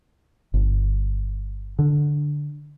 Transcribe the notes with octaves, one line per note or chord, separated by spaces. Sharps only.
G1
D3